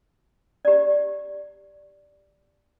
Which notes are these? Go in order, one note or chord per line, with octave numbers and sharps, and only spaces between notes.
G4 D5